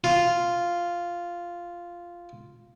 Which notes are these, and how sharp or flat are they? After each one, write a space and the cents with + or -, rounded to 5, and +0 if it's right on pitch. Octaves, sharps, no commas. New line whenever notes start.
F4 -5